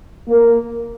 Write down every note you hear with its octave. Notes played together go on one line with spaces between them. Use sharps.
A#3